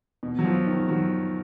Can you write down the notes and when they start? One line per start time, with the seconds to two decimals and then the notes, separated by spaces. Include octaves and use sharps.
0.23 B2
0.39 F#3
0.45 F3
0.66 D#3
0.89 F#3